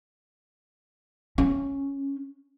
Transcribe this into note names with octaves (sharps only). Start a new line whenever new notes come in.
C#4